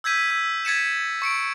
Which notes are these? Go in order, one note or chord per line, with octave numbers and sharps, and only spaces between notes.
E6 G6 G#6 B6 D#7
E6
G#6 A6 B6 C#7 D#7 E7
C#6 C#7 D7